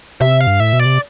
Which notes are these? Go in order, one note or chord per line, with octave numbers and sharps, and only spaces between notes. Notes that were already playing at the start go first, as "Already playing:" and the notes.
C3 E5
F5
G2
A2 E5
B2
D5
C3